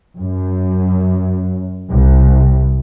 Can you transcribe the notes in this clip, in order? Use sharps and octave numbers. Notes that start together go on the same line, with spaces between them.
F#2
C2